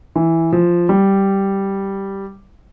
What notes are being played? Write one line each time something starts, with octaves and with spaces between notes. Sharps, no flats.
E3
F3
G3